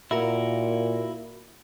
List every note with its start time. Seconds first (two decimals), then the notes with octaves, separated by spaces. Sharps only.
0.11 A#2 E4 F#4 A#4